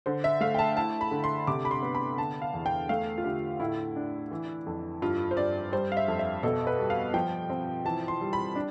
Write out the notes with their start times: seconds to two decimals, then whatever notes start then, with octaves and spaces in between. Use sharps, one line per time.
0.06 D3 C5
0.24 E5
0.41 A3 F5
0.54 G5
0.59 A5
0.77 E4 A5
1.01 B5
1.11 D3
1.24 C6
1.47 C3 D6
1.65 B5
1.71 C6
1.82 B3
1.95 B5
2.18 D3 A5
2.42 F5
2.54 E2
2.66 G5
2.89 A3 F5
3.18 F4
3.24 D3 G4
3.60 A2 E4
3.96 D4
4.31 E3
4.66 F2
5.02 G2 F4
5.31 C5
5.37 G2 D5
5.72 G3 C5
5.92 F5
5.97 E5
6.08 F2
6.19 E5
6.43 B2 A4
6.67 B4
6.79 G3
6.90 F5
7.14 F3 G5
7.50 C4
7.85 E3 A5
8.08 C6
8.21 G3
8.33 B5
8.55 D4